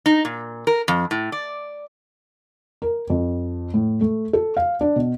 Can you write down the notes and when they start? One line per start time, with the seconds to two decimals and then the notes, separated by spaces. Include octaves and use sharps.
0.06 D#4
0.25 A#2
0.67 A#4
0.88 F2
1.11 A2
1.32 D5
2.82 A#4
3.10 F2
3.74 A2
4.01 A3
4.33 A4
4.57 F5
4.81 D4
4.96 B2